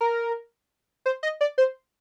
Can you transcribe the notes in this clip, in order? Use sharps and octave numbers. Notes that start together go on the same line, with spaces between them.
A#4
C5
D#5
D5
C5